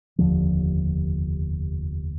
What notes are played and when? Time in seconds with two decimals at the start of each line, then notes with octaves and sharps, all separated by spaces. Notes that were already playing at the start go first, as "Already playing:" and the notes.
0.18 F1 D#2 D3 F3